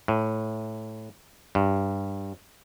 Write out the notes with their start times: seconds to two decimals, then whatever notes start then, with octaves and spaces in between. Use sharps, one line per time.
0.08 A2
1.55 G2